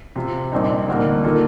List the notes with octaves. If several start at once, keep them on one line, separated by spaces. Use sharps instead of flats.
C3 F3 C4 F4
A#1 A#2 G3 C4 D#4
D2 D3 G3 A#3 D#4
D#3 A#3 F4 A4